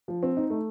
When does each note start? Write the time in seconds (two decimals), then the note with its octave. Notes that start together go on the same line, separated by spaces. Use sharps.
0.08 F3
0.23 C4
0.37 D#4
0.50 A3